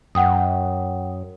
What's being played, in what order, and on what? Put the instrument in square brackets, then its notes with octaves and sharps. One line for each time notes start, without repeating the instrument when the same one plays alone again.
[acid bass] F#2 [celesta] F#5 G5 D#6